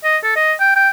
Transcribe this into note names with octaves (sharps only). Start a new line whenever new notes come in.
D#5
A4
D#5
G5
G5